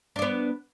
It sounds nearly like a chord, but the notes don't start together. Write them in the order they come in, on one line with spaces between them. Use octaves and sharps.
D4 D5 B3